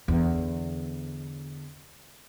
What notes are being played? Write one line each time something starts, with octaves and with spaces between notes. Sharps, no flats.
E2 D3